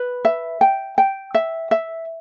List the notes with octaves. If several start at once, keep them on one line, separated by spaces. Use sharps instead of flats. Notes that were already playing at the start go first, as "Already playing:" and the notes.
Already playing: B4
E5
G5
G5
E5
E5